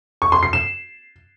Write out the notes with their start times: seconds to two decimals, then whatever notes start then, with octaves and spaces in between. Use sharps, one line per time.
0.22 C#6
0.32 C6
0.43 C7
0.53 E7